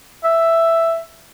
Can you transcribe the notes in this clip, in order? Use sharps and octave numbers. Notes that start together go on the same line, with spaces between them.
E5